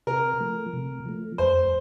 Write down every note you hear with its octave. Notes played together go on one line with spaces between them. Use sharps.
C3 A#4
F3 A3
C3
F3 A3
F2 C5